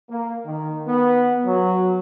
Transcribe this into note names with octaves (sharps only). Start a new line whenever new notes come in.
A#3
D#3
B3
F#3